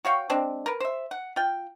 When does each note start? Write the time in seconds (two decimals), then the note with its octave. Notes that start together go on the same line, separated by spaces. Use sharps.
0.05 F#4 C#5 F5 G5
0.30 G#3 C4 D4
0.66 A#4 B4
0.80 C5 E5
1.11 F#5
1.36 F4 G5